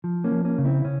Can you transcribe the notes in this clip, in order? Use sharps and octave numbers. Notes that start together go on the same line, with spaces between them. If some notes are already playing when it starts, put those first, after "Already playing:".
F3
A#3 C#4
F3
A#3 C#4
C#3
C4 E4
C#3 C#4